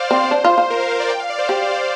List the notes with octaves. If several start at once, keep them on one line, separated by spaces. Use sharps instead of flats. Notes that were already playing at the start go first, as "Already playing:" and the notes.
Already playing: C5 D5 F5
C4
D4
F4
F4
A#4
F5
C5
D5
G5
F5
D5
C5
G4 D5
C5
D5